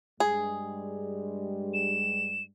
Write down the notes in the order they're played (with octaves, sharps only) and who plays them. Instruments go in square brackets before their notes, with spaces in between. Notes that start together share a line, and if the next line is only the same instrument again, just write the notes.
[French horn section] G2 G3 G#3 [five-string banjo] G#4
[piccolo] E7